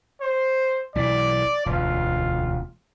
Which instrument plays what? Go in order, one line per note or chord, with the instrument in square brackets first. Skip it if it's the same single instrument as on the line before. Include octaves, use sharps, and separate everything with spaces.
[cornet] C5
[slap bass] B1 E3 [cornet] D5
[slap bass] E1 D2 [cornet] F4